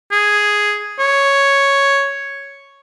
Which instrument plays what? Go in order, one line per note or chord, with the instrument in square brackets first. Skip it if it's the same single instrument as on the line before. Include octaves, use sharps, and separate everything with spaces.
[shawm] G#4
C#5